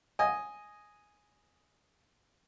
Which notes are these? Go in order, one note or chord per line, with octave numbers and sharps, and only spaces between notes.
D#5 G#5